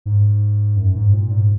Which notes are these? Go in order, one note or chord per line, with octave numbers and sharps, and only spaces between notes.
G#2
F#2
G#2
A#2
G#2